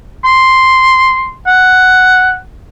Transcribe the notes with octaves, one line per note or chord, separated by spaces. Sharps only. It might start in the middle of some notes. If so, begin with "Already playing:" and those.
C6
F#5